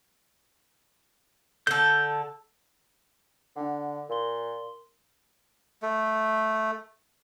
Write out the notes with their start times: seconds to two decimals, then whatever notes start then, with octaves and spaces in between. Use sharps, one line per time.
1.67 D3 A4 G6
3.56 D3 D4 F#5
4.10 A#2 A#4 C6 G7
5.82 A3